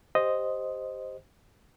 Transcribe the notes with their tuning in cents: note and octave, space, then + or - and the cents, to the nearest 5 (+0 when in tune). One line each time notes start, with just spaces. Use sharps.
G4 +5 C5 +0 D#5 +0